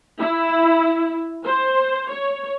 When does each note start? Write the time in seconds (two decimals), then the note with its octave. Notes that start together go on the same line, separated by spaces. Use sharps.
0.20 E4
1.45 C5
2.10 C#5